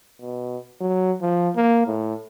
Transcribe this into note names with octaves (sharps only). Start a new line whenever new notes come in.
B2
F#3
F3
A#3
A2